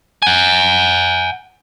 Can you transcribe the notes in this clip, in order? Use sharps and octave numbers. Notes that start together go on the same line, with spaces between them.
F#5 G#5